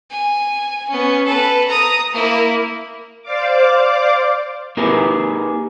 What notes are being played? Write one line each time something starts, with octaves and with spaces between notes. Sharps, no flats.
G#5
B3 C#4
A4 B4
A#5 D#6
A#3 E4
C5 D5 F5 D6
A#3 D#4 G4 G#4 A#4 B4